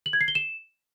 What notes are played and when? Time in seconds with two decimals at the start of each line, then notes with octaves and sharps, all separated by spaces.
0.06 F#7
0.13 G#6
0.21 C7
0.28 G7
0.35 E7